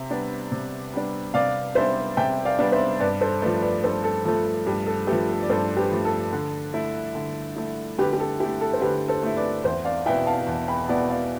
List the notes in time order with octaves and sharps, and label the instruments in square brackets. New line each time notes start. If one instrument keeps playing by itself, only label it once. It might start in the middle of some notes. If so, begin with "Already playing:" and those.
Already playing: [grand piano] C3 [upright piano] E5
[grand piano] G3 B3 D4
C3
G3 B3 D4
[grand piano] C3 [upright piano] D5 F5
[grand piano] G3 B3 D4 [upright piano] C5 E5
[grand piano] C3 [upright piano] E5 G5
[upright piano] D5 F5
[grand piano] G3 B3 D4
[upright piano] C5 E5
[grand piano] G2 [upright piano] B4 D5
[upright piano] A4 C5
[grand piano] A3 [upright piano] B4 D5
[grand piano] F3
[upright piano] B4 D5
[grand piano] G2 [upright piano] A4 C5
[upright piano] A4
[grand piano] F3 [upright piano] A4
[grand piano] A3
[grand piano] G2 [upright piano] G4
[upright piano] A4
[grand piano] A3 [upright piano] G4 B4
[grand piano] F3
[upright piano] A4
D5
[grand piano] G2 [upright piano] A4 C5
[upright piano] G4 B4
[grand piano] F3 A3
[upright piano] A4
[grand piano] D3
A3 E4
D3
A3 E4
[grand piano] D3 [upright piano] G4 B4
[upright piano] G4
A4
[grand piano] E4 [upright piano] G4
[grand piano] A3
[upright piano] A4
C5
[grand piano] D3 [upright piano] G4 B4
[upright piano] A4 C5
[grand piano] A3 E4
[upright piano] B4 D5
[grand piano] E2 [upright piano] C5 E5
[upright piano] D5 F5
[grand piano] B2 B3 E4 [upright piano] E5 G5
[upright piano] F5 A5
[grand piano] E2
[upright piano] G5 B5
[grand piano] B2 B3 E4 [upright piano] B4 D5
[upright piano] D5 F5